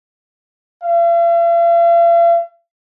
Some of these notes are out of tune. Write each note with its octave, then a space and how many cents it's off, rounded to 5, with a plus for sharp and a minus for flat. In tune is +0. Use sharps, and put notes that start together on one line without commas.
F5 -45